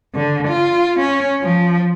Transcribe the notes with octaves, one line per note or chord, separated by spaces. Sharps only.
D3
F4
C#4
F3